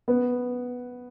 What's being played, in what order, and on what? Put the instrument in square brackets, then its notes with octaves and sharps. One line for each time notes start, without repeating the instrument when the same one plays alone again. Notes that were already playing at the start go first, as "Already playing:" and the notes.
[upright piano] B3